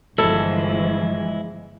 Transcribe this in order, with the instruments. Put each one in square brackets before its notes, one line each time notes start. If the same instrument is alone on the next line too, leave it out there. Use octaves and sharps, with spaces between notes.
[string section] G1 E3 F3 [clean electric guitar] G#3 E4 [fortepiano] A4